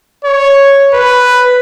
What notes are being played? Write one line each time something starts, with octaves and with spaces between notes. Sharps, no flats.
C#5
B4